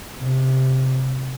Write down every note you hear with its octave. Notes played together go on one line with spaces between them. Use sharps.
C3